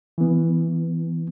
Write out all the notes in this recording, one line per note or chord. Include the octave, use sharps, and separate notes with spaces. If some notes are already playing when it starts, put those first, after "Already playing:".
E3 B3